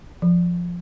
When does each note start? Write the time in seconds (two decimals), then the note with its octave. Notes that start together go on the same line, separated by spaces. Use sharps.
0.22 F3